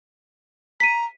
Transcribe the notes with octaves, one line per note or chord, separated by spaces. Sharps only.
A#5 B6 D#7